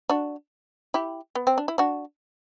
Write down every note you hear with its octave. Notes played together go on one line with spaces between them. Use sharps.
D4 F#4
E4 G4
B3
C4
D4
E4
D4 F#4